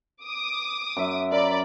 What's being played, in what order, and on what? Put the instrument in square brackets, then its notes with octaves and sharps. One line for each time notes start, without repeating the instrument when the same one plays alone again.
[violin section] D6 D#6
[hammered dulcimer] F#2 E5
[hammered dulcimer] A#4 [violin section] D5 B5